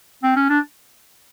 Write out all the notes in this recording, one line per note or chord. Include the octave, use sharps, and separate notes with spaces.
C4
C#4
D4